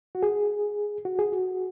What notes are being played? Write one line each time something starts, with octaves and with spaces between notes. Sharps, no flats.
F#4
G#4
F#4
G#4
F#4